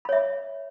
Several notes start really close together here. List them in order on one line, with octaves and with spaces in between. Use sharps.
B5 C#5 E5